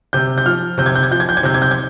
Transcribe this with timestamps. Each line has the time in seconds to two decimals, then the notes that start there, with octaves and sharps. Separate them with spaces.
0.13 C3 G6
0.38 G6
0.46 F3 F6
0.78 C3 G6
0.86 G#6
0.96 G6
1.03 G#6
1.11 F3 G6
1.20 G#6
1.29 G6
1.37 G#6
1.43 C3 G6
1.54 G#6
1.62 G6
1.71 G#6